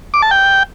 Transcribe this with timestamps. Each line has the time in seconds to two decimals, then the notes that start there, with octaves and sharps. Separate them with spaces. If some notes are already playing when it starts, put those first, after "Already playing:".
0.14 D6
0.22 A5
0.31 G5